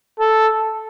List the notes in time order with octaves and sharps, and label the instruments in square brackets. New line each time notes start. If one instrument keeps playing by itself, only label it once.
[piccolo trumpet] A4